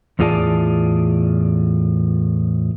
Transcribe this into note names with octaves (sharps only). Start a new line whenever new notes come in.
E2 A2 F4 G#4 D5 A5